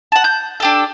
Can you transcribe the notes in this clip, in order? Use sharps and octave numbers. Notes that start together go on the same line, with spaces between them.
F#5 A5
G6
D4 G4 A4